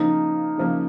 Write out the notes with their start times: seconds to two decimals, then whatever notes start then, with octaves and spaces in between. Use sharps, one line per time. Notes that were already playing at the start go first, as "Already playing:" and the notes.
Already playing: C#3 F3 A#3 D#4
0.58 C#3 F3 A#3